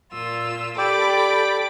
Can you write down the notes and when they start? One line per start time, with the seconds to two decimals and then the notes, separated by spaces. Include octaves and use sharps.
0.12 A#2 F4 E6
0.78 G4 A4 D5 G5 B5 D6